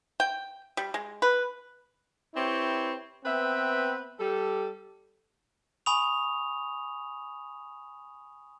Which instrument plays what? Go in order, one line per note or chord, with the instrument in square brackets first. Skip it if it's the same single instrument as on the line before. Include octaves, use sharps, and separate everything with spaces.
[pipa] G5
G3
G#3
B4
[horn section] C4 E4 G4 B4 C#5
B3 C4 B4 E5 G5
G3 G4 A4
[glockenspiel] G#5 B5 C#6 D#6 F7